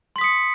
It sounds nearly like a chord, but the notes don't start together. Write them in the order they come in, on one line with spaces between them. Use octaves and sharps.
C6 B6 D#6 C#7